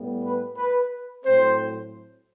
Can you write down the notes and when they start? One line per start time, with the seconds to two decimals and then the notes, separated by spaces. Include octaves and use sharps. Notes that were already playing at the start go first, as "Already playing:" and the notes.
Already playing: A2 G3 B3
0.24 B4
0.57 B4
1.25 A2 F#3 C4 C5